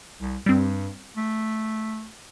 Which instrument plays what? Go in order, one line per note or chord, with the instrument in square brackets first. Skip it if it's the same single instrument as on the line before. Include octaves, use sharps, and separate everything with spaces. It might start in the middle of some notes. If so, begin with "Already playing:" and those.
[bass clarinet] C2
[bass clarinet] G2 [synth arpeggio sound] G3 C4
[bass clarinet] A3